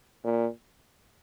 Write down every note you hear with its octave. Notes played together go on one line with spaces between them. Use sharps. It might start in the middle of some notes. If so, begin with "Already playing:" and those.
A#2